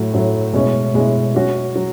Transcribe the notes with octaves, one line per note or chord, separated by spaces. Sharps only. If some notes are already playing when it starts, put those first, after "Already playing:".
Already playing: A2 F#3 A3
A2 F#3 A3
B2 G#3 C#4 E4
B2 G#3 C#4 E4
F#3 C#4 F#4
F#3